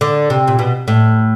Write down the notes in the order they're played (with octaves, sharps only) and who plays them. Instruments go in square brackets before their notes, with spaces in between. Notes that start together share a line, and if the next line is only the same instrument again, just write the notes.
[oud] D3
C3
A#2
B2
A2